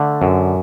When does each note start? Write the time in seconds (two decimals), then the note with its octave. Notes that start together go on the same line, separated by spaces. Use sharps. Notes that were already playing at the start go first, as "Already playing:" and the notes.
Already playing: D3 A3
0.22 F#2